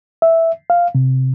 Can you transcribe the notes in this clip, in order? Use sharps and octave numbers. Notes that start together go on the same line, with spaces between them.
E5
F5
C3